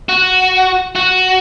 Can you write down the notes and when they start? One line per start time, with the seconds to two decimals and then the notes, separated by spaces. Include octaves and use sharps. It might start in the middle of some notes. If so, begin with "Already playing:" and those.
0.09 F#4
0.95 F#4